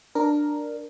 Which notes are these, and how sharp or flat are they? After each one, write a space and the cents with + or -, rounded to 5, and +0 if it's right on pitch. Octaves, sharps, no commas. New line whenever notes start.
D4 +10 A#4 +0